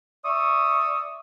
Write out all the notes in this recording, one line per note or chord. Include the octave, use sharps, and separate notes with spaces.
D5 E5 C#6 D#6